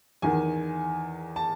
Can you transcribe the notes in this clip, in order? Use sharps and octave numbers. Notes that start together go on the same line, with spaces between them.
E2 D#3 G#5
A5